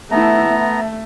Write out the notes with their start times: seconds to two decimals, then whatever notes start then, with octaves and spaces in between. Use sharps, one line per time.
0.11 A3 B3 E4 E5 A5 A#5
0.49 A3